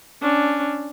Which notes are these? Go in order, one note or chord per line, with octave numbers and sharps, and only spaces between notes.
C#4 D4